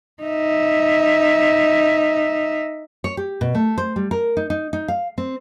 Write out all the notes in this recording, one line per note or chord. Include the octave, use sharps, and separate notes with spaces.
D#4 E5
C#5
G4
B2
A3
C5
G3
A#4
D#4
D#4
D#4
F5
C4